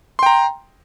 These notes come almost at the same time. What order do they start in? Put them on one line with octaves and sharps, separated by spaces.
C6 G5 A#5